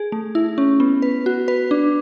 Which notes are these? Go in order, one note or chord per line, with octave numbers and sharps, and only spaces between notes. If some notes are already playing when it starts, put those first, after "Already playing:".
Already playing: G#4
A3
E4
C#4
B3
B4
F#4
B4
D4